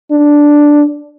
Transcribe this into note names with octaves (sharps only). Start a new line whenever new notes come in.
D4